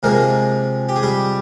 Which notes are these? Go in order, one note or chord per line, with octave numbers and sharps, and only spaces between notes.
C3 F3 G#3 A#3 A#4
G4
G#4
G3 G4